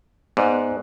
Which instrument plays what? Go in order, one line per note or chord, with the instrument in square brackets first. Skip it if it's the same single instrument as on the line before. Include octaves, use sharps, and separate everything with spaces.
[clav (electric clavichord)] G#2 [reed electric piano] B3 D5 F#6